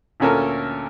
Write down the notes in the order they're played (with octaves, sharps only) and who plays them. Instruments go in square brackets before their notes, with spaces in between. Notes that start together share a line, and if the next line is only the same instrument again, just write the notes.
[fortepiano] D2 A#2 C#4 A4 A#4